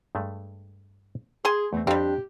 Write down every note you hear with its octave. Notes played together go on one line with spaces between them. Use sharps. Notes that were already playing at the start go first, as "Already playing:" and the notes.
G2 G#3 A3
G#4 G#5 C6
E2 A3 C4
F2 G3 C4 D4 G4